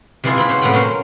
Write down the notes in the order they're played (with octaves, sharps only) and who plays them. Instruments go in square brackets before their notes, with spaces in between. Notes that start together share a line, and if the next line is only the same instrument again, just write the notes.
[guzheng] C3 E3 G#3 E4 F4 G#4
C3 C4 E4 B5
C#4 C5 F#5
A2 C3 B3 F#5 G5 B5
F#3 C#4 A#4 C5